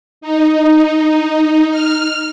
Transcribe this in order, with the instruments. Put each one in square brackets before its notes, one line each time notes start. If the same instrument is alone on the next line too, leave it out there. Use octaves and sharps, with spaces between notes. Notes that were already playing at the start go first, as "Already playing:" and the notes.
[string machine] D#4
F6